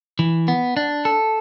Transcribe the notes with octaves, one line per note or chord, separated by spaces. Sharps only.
E3
B3
D4
A4